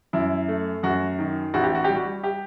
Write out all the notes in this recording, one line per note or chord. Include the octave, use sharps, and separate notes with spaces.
F#2 E4
A3
F#2 F#4
D#3
A1 F#4
G4
F#4
G3 G4
F#4
G4